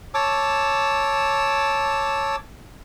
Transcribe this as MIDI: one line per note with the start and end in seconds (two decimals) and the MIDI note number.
0.14 2.36 73
0.14 2.36 81
0.14 2.36 86
0.14 2.36 88